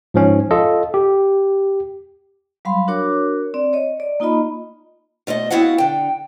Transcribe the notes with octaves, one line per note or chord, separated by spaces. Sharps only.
G#2 F3 C#4
F4 A4 D#5
G4
F#3 G3 F5 B5 C6
D4 F#4 A#4 C#5 D6
C4 D5
C#5 D#5
D5
A#3 D#4 F4 D#5 B5
B2 A3 C5 D#5
B3 C4 E4 F#4 F5 F#5
D3 G5